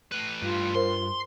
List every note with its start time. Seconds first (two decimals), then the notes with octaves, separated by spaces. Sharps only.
0.11 A2 B4
0.42 G2 F4
0.75 A#4 C5 C6